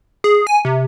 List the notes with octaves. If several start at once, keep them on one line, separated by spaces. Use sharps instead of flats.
G#4
G#5
C3